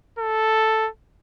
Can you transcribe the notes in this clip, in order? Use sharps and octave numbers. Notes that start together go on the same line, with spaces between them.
A4